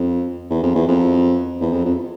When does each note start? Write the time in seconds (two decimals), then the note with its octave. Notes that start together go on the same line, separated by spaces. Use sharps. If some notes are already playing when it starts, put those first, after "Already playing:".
Already playing: F2
0.50 E2
0.63 F2
0.75 E2
0.88 F2
1.60 E2
1.72 F2
1.85 F2